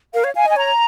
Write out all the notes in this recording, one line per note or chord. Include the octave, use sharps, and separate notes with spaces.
A#4 F5
C#5
F5 G#5
D#5
G#5
C#5 A#5